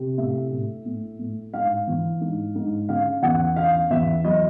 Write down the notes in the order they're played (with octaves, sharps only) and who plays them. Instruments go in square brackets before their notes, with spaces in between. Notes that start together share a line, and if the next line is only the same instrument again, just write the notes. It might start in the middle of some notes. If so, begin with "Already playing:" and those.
Already playing: [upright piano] C3
A2 E5
A2
A2
A2
G#2 F5
E3
G#2
G#2
C#3 F5
E2 F#5
C#3 F5
E2 E5
F#3 D#5